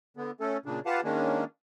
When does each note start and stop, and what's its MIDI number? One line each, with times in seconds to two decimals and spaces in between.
0.17 0.31 50
0.17 0.31 59
0.40 0.57 57
0.40 0.57 61
0.40 0.57 69
0.66 0.80 46
0.66 0.80 49
0.66 0.80 62
0.86 1.01 65
0.86 1.01 67
0.86 1.01 71
0.86 1.01 77
0.86 1.01 78
0.86 1.01 81
1.04 1.44 51
1.04 1.44 56
1.04 1.44 58
1.04 1.44 61
1.04 1.44 62